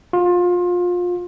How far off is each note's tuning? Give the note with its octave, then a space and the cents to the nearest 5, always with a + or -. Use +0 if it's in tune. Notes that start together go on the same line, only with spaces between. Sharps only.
F4 +25